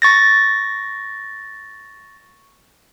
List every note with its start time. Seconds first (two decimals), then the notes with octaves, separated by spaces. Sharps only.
0.02 C#6 A6 A#6